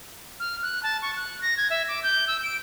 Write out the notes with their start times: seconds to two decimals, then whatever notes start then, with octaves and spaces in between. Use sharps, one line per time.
0.40 F6
0.62 F#6
0.83 A5
1.02 C#6
1.16 F#6
1.42 A#6
1.57 G#6
1.70 E5
1.88 D6
2.03 G6
2.28 E6
2.43 D7